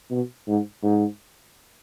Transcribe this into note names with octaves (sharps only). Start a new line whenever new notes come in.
B2
G#2
G#2